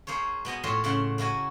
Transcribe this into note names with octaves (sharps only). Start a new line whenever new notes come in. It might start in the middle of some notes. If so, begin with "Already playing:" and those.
A#3 G#4 C5 C#5
B2 B3 D#5 G#5
A2 C4 F4 C5 C#5 C6
A2 C#3 F#5 C6
A#3 E4 F#4 G#5